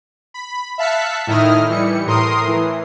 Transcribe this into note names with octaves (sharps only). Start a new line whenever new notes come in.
B5
E5 F5 A5 F#6 B6 C#7
A2 D#3 D#4 E4 D#6 F6
E3 G3 C#7
A2 A#4 C6 D#6 C7
E3